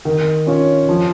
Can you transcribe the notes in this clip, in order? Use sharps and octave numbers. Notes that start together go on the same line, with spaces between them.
D#3
C#4 F4 C#5
F3